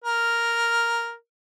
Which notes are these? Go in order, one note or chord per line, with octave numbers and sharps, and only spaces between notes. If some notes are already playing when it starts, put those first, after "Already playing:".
A#4